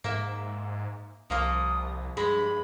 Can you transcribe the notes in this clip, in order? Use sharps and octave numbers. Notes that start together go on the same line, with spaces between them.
G#2 A#3 E5
C2 F3 A#3 F4 D#6
G2 G#3 G#4 B5